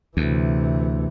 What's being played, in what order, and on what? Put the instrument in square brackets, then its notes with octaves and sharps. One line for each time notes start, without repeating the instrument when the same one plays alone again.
[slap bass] D2 [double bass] C3 E3